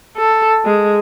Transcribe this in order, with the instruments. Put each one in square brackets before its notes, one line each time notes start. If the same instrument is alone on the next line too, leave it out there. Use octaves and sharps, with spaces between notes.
[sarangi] A4
G#3